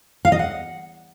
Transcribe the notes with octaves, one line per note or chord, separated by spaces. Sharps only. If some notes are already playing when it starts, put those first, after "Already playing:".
F5
D#5
F#5